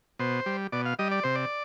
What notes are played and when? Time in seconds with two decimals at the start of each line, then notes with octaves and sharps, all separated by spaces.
0.19 B2 C5
0.46 G3
0.72 B2 D5
0.85 F5
0.99 G3 D#5
1.11 D5
1.23 C3 C5
1.35 D5